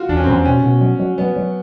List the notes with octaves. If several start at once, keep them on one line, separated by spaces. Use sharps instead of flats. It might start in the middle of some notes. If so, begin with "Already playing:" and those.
Already playing: F4 F#4
E2 D4
C#4
C4
E2 C#4
B2 C#4
B2
F#3
F#3
F#3 B3
F#3